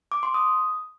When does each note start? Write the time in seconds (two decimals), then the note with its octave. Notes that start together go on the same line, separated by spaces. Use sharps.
0.12 D6
0.23 C6
0.34 D#6